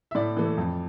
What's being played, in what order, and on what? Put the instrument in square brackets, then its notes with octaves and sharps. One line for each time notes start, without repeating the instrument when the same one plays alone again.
[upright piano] E5
A2 D5
E3 A3
F2